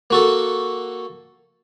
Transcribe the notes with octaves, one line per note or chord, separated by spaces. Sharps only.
A#3 F#4 A4